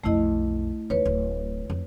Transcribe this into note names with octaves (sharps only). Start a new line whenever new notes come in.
B1 F2 A3 E4 D#5
E2 D#4 B4 C#5
D1
F2